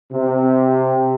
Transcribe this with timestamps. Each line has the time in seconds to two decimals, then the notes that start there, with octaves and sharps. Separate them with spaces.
0.12 C3